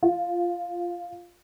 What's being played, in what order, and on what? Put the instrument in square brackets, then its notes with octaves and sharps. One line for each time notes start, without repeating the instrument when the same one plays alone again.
[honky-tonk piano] F4